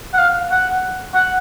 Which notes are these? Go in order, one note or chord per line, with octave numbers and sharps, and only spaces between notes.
F#5
F5
F#5
F#5